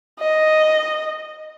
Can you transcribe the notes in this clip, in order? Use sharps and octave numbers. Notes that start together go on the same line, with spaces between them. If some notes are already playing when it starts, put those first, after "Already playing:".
D#5